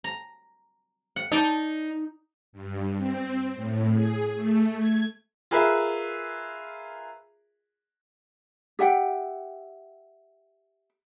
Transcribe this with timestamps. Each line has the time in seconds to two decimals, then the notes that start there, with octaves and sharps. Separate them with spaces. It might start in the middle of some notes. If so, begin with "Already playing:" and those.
0.04 A#5
1.16 F#5
1.32 D#4 D5 A5
2.53 G2
2.97 C4
3.55 A2
3.93 G#4
4.35 A3
4.76 G#6
5.51 F4 G#4 A#4 B4 E5
8.79 G4 E5 F#5 G5